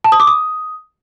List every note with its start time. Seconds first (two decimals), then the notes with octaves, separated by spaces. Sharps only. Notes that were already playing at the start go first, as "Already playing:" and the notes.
0.04 A5
0.12 D#6
0.20 D6
0.27 D#6